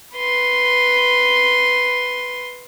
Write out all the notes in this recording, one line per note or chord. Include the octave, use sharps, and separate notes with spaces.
B4 C6